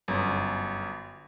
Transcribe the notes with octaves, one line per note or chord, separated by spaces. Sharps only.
G1 F#2